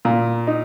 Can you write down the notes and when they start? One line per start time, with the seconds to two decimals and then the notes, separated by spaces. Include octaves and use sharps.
0.05 A#2
0.47 D#4